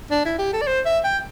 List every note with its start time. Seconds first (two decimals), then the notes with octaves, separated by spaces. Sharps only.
0.11 D4
0.25 E4
0.39 G4
0.53 A4
0.62 D5
0.67 C5
0.86 E5
1.04 G5